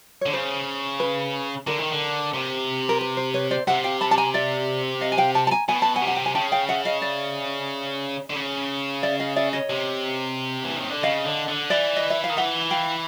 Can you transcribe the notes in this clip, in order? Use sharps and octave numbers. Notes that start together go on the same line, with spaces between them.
D3 C#5
C#3 C5
B4
D3 A#4
D#3
D3
C3
A#4
B4
C5
B4 C#5
C5 D5
C3 E5 F#5
F5 G5
A5 B5
A5
G#5 A#5
D5 E5
D#5 F5
G#5
F5 G5
G5 A5
A5
G#5 A#5
B2 G#5
A5
F#5 G#5
C3
F#5
G5
G#5
C#3 G5 A5
F5 G5
E5 F#5
D#5 F5
D5 E5
D3
C#3
D5 E5
D#5 F5
D5 E5
C#5 D#5
C3
E3
D#3
D3
C#3 D#5 F5
D3
D3
E3 D5 E5
D#5
E5
F5
D#3
E3 E5 F#5
F5 G5